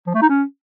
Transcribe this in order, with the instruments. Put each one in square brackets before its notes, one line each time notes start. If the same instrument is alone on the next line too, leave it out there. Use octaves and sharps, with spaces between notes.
[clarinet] F3
A3
D#4
C#4